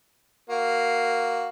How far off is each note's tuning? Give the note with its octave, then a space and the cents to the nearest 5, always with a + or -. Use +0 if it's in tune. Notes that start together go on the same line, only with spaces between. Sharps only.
A#3 +0 F#4 +0 F5 +0